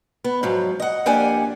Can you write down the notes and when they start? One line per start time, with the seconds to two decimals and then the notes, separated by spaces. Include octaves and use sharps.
0.24 B3
0.43 G#2 F3 F#3
0.80 D#5 F#5
1.06 F2 A#3 D4 G4 F#5 G#5